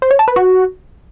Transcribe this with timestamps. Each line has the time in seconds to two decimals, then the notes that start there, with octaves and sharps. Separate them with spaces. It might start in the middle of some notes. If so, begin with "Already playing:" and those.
0.02 C5
0.11 C#5
0.19 A5
0.28 B4
0.36 F#4